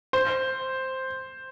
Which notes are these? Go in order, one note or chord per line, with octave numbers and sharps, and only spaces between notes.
C5